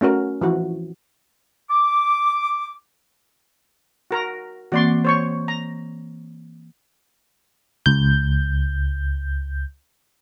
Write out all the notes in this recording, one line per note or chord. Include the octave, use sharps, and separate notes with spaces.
A3 C#4 F#4 A#4
E3 F3 F#4
D6
F#4 A#4 A#5
E3 A#3 C4 F#4 D5 C6
C5 C#5 C#6
A#5
C#2 G6